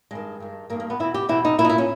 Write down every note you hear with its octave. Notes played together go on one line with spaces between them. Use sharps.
G2 D#3 G#3
G2 D#3
G2 D#3 A#3
A#3
B3
E2 B2 E4
G4
E2 B2 E4
D#4
A#2 E4
D#4
E4
C#4